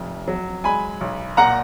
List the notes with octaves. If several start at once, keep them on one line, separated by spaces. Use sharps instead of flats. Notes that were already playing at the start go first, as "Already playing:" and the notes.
Already playing: F1 F2
F#3
G#3 G#5 B5
B1
A#2 F#5 A#5